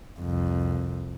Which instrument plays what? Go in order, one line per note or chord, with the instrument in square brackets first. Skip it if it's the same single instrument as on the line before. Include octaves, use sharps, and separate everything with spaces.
[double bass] C2 F2